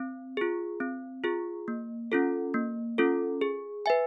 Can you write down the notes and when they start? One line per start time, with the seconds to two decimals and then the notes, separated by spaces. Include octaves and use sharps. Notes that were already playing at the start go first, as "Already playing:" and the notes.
Already playing: C4
0.37 F4 G#4
0.80 C4
1.24 F4 G#4
1.68 A#3
2.12 C#4 F4 A4
2.54 A#3
2.98 C#4 F4 A4
3.41 G#4
3.86 B4 E5 G#5